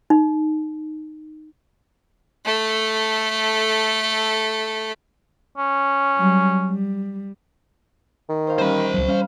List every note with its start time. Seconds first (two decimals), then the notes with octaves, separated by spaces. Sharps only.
0.10 D#4
2.45 A3 A4
5.58 C#4
6.18 F#3 G3
6.66 G3
8.29 D#3
8.47 C5 F5
8.59 E3 G3 C#4 C5 B5
8.94 C#2 F#3
9.08 G3 C#4 F5